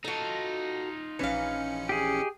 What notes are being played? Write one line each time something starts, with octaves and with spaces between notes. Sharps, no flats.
D#4 F4 F#4 A4
A#1 E3 C#4 F5 C#7
G4 G#4